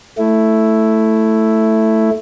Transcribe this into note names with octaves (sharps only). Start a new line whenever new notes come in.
A3 E4